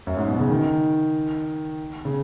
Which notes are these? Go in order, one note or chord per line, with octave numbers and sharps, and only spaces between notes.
F#2
G#2
B2
C#3
D#3
C#3